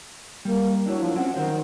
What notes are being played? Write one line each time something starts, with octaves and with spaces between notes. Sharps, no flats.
G3 A#3
F#3 D4 E4
F3
F#3 C4 C#4 F#5
D#3 F#3 C5